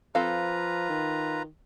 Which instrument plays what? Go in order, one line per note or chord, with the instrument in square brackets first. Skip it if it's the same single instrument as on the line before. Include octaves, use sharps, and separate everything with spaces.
[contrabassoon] F3 [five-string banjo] C4 A4 F5 [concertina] F4 B4 A#5
[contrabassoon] D#3